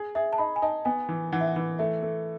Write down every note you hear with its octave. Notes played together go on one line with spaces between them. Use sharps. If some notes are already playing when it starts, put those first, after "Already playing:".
Already playing: G#4
G#4 E5
A5
D#4 B5
G#5
D#4 A5
B3 G#5
E3
E3 F#5
E5
F#5
E3
A3 E5
A3